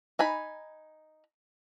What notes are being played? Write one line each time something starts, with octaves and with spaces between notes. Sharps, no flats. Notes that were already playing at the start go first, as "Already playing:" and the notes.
D#4 G#5 B5